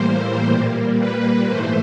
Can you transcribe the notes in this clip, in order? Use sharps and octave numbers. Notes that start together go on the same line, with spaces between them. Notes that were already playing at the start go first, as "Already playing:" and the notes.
Already playing: A2 E3 G3 A#3 C5
A#2 G3 A#3
B4
G#2 E3 A3 C5